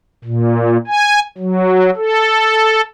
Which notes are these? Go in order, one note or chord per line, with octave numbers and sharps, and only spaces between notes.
A#2
G#5
F#3
A4